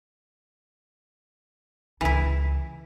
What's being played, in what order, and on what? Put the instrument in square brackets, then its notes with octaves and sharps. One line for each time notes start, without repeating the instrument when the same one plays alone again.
[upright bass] C#2 [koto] E3 E4